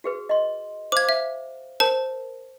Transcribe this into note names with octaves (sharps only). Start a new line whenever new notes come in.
F#4 G#4 B4
D#5 C6
C5 F5 D6 G#6
E5
A#4 C5 A5